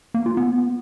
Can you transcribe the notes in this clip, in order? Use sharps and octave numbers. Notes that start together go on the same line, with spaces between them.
A#3
F4
B3